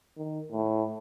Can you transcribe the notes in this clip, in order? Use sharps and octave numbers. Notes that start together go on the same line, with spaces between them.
D#3
A2